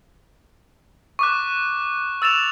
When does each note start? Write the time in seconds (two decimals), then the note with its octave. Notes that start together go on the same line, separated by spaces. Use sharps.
1.19 C#6 D6 F#6
2.22 E6 A6 E7 F7